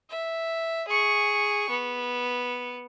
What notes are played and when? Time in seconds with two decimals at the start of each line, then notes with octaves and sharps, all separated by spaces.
0.10 E5
0.88 G#4 C#6
1.70 B3